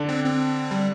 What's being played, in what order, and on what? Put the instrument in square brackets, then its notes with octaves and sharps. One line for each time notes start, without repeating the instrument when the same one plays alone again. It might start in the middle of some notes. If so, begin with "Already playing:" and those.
Already playing: [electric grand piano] D3 D4
[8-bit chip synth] C4
C4
G3